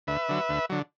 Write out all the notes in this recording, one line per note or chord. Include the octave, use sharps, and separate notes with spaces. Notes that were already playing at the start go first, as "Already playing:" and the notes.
D2 B4 E5
D3 F#3
D2
D3 F#3